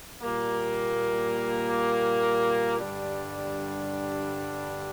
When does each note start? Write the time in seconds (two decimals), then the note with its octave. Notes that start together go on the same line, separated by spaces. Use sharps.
0.22 A#2 G3 A#3
2.79 G2 D3 G3 D4